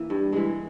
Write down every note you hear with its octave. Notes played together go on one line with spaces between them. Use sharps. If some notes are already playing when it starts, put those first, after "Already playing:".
Already playing: E3 A#3
G2
E3 G#3